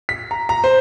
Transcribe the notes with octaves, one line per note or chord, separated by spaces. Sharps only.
B6
A#5
A#5
C5